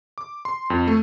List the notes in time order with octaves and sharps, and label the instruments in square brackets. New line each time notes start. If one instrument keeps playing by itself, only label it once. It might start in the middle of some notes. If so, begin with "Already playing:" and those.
[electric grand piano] D6
C6
F2
A3